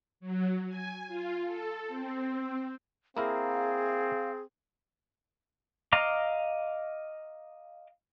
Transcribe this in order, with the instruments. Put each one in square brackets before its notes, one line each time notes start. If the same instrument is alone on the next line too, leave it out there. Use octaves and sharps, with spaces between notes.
[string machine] F#3
G#5
F4
A4
C4
[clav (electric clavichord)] A#3 E4 A#4 [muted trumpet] C4 [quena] G#4 [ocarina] F5
[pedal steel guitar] D#5 F5 A#5 D6